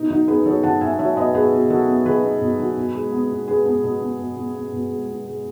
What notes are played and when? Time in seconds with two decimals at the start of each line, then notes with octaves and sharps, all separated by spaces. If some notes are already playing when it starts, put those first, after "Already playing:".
Already playing: B2 D#4
0.10 F#3 D#4
0.28 B3 G#4 B4
0.46 F#3 A4 C#5
0.63 F#3 F#5 A5
0.81 B2 E5 G#5
0.99 F#3 C#5 E5
1.17 B2 B4 D#5
1.35 B2 G#4 B4
1.52 B2
1.70 F#3 F#4 A4
1.88 B3
2.05 F#3 G#4 B4
2.24 B3
2.41 B2
2.59 F#3
2.77 B2
2.95 G#3
3.12 B3
3.30 B2
3.48 G#3 G#4 B4
3.65 B3
3.84 B2
4.01 B2
4.19 B2
4.37 B2
4.55 B3
4.73 B2
4.90 G#3
5.09 B2
5.26 G#3